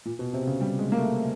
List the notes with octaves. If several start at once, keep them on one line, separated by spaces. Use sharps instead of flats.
A#2
B2
C3
C#3
G3
G#3
A#3
A3